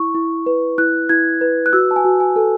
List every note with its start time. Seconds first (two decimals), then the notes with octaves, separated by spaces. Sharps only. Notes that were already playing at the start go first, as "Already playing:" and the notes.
Already playing: E4 C#6
0.15 E4
0.46 B4
0.78 E4 F#6
1.09 E4 G#6
1.41 B4
1.66 F#6
1.73 F#4 E6
1.91 A5
1.96 G#5
2.05 F#4
2.20 G#5
2.36 A4